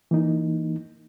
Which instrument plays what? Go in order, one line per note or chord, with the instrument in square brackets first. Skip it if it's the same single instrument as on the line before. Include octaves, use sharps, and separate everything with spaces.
[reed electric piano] E3 A#3 D#4